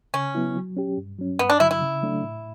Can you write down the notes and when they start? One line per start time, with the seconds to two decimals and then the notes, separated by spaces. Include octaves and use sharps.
0.14 C#3 C#4
0.35 F#3 B3 E4
0.56 F#3
0.77 C#4 G4
0.98 G2
1.19 F#3 C#4
1.39 G2 B3
1.50 D4
1.60 D3 F#3 E4
1.71 E4
1.82 C#3
2.02 F#3 A3 D4
2.22 A2